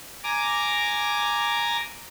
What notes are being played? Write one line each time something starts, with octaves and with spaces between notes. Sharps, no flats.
G#5 A#5 D6